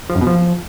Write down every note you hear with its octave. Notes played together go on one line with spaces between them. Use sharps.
F3
F#2
B2
F3